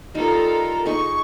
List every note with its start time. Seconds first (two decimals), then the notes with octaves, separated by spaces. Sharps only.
0.15 G3 D#4 F4 A4 A#4
0.86 D#4 G#4 C#6